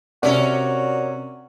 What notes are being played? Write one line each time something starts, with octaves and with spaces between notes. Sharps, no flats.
C3 C#4 F#4 A#4 D5